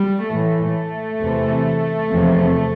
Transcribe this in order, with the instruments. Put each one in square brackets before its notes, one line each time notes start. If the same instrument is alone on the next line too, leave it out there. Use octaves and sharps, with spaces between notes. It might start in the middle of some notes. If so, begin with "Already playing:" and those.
Already playing: [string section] G3
A2 E3 A3
E2 C3 E3
E2 C3 F3